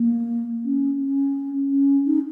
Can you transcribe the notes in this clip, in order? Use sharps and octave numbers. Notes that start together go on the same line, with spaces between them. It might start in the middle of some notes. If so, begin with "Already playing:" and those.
Already playing: A#3
C#4
C#4
C#4
D#4